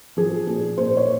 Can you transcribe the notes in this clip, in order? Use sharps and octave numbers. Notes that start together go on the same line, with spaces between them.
F3 G#4
A#2 G#4
A#2 C5
C#5